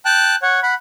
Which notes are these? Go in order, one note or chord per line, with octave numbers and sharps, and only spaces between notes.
G5 A5 F#6
C#5 F#5
F#5 B5